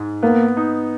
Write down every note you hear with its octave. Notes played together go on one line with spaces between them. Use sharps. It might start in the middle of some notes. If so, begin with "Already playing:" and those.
Already playing: G#2
A#3 B3
D#4